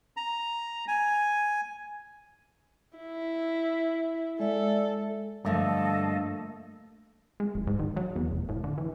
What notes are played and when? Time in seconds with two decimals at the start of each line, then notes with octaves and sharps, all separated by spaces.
0.17 A#5
0.88 G#5
2.98 E4
4.40 G#3 A4 D5 E5
5.45 G2 D3 F3 A3 A#3 A4 D#5 F5
7.40 G#3
7.55 D1
7.67 G#2
7.79 D#3
7.96 F#3
8.16 E2
8.31 F1
8.49 A2
8.64 D3
8.78 E3